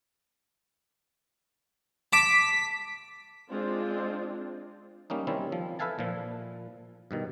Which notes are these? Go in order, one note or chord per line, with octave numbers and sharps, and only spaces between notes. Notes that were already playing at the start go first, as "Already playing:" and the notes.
A5 D6 B6
G#3 C4 D4 F4
G3 A#3 C#4 D#4
D#3 G3 C4 C#4 E4
F3
A4 B4 E5 F5 G#5 A5
A#2 F3
G2 B2 D#3